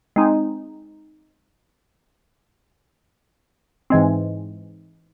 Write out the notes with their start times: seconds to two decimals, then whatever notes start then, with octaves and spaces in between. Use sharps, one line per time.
0.16 G#3 C4 D#4
3.90 G#2 E3 G#3 C4